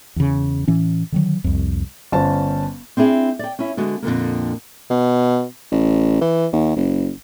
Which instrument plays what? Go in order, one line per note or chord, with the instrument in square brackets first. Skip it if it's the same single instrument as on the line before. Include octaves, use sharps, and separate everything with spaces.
[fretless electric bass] E2 C#3
A2 E3 C#4
D3 D#3 F#3
C2 F2
[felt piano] G1 C#4 C5 A5
[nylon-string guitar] C4 D4 E4 G#4
D5 G5
C#4 E4
D3 G#3 B3 F#4
F2 A#2 D3 A#3
[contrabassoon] B2
A1
E3
D#2
F#1